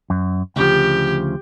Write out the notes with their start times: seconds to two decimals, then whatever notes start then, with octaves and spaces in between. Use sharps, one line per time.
0.10 F#2
0.56 D2 C#3 F3 G4